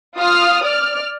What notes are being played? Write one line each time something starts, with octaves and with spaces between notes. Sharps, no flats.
F4 D#6 F6
D5 F6